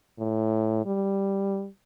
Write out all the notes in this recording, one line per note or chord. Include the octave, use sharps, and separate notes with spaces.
A2
G3